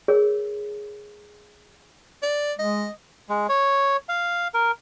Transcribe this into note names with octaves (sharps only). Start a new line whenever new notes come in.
G#4 A#4 C#5 E6
D5
G#3 D#5
G#3
C#5
F5
A#4